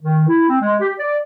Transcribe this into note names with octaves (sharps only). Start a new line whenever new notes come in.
D#3
E4
C4
G#3
G4
D5